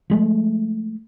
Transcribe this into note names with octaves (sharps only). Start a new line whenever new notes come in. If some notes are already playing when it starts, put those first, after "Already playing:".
F3 G#3 A3